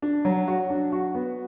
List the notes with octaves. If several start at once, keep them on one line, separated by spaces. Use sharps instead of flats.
D4
F#3
F#4
D4
F#4
B3